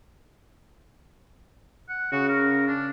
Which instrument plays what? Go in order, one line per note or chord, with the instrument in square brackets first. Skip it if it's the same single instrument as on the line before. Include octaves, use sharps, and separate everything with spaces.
[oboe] F#5
[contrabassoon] C#3 [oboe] F#4
[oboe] A#4
D4